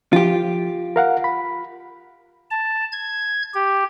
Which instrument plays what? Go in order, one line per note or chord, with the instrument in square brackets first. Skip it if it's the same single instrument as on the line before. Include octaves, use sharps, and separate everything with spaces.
[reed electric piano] F3 [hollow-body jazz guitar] F4 G4
[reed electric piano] A#4 F5 F#5
B5
[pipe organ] A5
G#6
G4